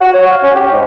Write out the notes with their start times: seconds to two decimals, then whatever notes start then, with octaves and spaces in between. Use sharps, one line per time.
0.01 F#4
0.14 C#5
0.30 F5
0.42 C#4
0.55 G4
0.72 G#2